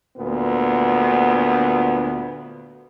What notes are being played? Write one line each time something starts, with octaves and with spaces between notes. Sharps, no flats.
D2 A#2 B3